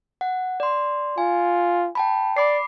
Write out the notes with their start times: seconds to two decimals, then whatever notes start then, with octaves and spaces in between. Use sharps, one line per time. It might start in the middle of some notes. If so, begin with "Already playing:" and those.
0.21 F#5
0.60 D5 C6
1.18 F4 G#5
1.95 G5 A5 B5
2.37 D5 B5 D6 C7